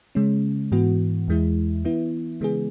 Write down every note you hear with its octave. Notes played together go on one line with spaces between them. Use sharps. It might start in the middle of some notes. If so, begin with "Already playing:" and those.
C#3 G#3 C#4
G#2 E3 B3 F#4
E2 E3 G#3 E4
E3 B3 E4
C#3 E3 G#3 B3 G#4